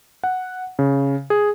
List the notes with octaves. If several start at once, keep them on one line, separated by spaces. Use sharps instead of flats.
F#5
C#3
G#4